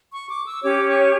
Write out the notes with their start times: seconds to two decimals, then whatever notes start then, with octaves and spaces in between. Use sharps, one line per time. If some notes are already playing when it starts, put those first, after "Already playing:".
0.13 C#6
0.29 D6
0.46 E6
0.62 C#4 G4 C#5 D6
0.87 C#6